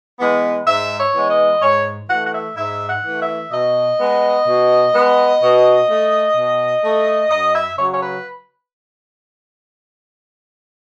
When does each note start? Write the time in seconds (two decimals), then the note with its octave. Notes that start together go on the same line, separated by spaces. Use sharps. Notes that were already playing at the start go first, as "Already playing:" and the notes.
0.20 E3 G#3 B3
0.67 G#2 E5
0.99 C#5
1.15 E3 G#3 B3
1.30 D#5
1.62 G#2 C#5
2.09 E3 A3 F#5
2.25 F#5
2.33 E5
2.57 G#2 E5
2.89 F#5
3.05 E3 A3
3.20 E5
3.51 B2 D#5
3.99 G#3 B3
4.47 B2
4.94 G#3 B3
5.41 B2
5.89 A3
6.36 B2
6.84 A3
7.31 F#2 D#5
7.55 E5
7.78 C#3 F#3 C#5
7.92 C#5
8.02 B4